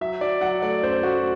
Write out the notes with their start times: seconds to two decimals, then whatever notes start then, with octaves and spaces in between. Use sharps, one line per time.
0.01 F#3 E5
0.21 F#3 D5
0.41 F#3 F#5
0.62 A3 D5
0.83 F#2 C5
1.03 A3 F#4